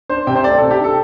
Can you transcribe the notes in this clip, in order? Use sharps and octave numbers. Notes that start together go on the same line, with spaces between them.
D4 C5
C3 G5
C5
A3 D5
C3 A4
G4
D4 A4